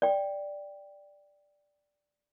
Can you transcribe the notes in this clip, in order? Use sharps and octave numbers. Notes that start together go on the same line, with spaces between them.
D5 G5